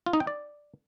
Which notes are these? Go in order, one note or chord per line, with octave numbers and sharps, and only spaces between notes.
F4
D#4
G5
D5